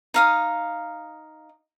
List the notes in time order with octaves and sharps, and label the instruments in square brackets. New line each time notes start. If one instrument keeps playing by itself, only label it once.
[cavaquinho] D#4 F5 D#6